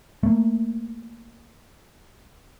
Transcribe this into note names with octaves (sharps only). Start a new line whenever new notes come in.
A3 A#3